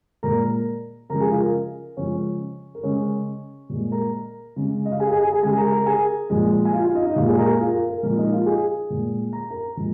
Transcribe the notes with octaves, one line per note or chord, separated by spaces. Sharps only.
A#2 G#3 A#4 A#5
C#3 F3 G#3 A#4 A#5
G#4 G#5
F4 F5
A#4
C#3 F3 G#3 C#4 C#5
A#4
C#3 G#3 C#4 C#5
A#2 G#3
A#4 A#5
C#3 G#3
D#5
F5
G#4 G#5
G#4 G#5
G#4 G#5
G#4 G#5
C#3 G#3 G#4 G#5
A#4 A#5
A#4 A#5
G#4 G#5
A#2 F3 G#3
G#5
F4 F5
F4 F5
D#4 D#5
D#4 D#5
A#2 G#3 F4 F5
G#4 G#5
A#4 A#5
G#4 G#5
F4 F5
A#4
A#4
A#2 F3 G#3 A#4
D#4 D#5
F4 F5
G#4 G#5
A#2 G#3
A#5
A#4 A#5
A#2 F3 G#3